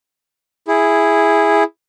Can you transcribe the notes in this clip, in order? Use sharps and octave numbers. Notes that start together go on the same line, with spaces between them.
E4 G#4